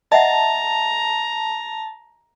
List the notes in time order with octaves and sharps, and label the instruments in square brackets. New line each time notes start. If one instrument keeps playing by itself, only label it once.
[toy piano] D#5 E5 F#5 [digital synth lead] A5 [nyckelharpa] A#5